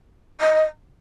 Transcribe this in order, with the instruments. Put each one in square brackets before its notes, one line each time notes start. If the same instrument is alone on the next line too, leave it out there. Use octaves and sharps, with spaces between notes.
[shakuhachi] D#5